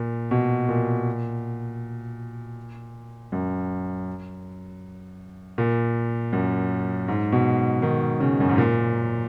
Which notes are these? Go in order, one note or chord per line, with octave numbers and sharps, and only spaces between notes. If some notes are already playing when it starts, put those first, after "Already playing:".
Already playing: A#2
B2
A#2
F#2
A#2
F#2
G#2
B2
D#3
C#3
F#2
G#2
A#2